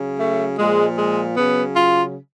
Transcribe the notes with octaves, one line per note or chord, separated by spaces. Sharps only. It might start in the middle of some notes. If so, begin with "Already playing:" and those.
Already playing: C#3 F#3
A3
A#2 F3 G#3
G#3
C#3 F#3 B3
F4